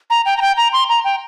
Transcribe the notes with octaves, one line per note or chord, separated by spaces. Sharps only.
A#5
G5
A#5
G5
A#5
C6
A#5
G5